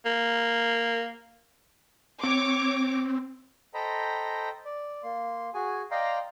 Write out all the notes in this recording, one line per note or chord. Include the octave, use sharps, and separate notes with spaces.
A#3
C4 C#5 D6
A4 C5 D#5 G5 A#5 B5
D5
A#3 C6
F#4 G#4 G#5
D5 D#5 F5 G5 A#5 C6